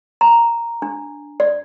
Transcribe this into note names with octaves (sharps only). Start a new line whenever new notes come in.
A#5
D4
D5